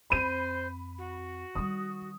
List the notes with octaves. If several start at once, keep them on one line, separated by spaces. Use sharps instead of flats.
F2 C4 C5 B5 D#7
F#4
D#3 G3 D#6